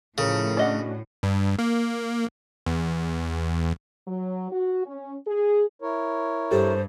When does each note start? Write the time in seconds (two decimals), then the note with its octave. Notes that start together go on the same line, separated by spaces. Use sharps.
0.18 A2 C#3 F3 A4 A#4
0.57 C#4 D4 F#4 D5 D#5 F#5
1.23 G2
1.59 A#3
2.66 E2
4.07 F#3
4.51 F#4
4.85 C#4
5.26 G#4
5.82 E4 A#4 C#5
6.51 G2 G4 A4 C5